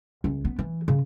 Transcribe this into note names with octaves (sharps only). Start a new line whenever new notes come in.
C#2
B3
E3
C#3